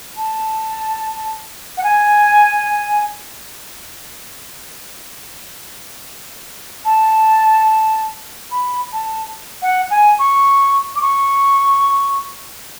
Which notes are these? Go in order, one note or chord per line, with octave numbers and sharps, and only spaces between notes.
A5
F#5
G#5
A5
B5
A5
F#5
G#5
C#6
D6
C#6